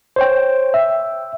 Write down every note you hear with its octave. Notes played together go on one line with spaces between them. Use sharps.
C5 C#5 G5
E5